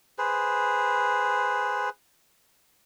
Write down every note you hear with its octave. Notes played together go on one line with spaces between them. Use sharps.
G#4 B4 C5